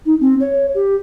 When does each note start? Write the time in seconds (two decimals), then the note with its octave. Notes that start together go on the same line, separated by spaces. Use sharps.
0.06 D#4
0.21 C4
0.40 C#5
0.75 G4